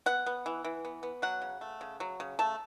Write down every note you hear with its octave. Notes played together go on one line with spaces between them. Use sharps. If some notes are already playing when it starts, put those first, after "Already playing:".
B3 F#5
B3
E3
E3
B3
B3
F#3 F#5
C#3
A3
C#3
F#3
C#3
A3 A5